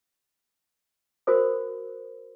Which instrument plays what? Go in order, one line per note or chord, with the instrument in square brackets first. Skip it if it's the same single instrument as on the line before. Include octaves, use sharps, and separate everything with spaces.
[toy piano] F#4 A#4 C5 D#6